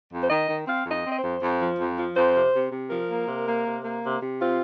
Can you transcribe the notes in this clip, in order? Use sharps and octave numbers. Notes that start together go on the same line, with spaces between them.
F2
C5
D#3 D#5
D#3
C4 F5
F2
D#5
C4
D#5
C5
F2
F2
F3
F2
F3
F2 C5
C3
C3
C3
F3 A#4
A#3
C3
A#3
C3
A#3
C3
C3
C4 F4